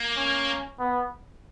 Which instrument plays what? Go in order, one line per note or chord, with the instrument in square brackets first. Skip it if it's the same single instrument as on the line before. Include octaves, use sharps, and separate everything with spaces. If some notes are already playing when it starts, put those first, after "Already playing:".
Already playing: [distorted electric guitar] A#3
[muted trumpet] C#4
B3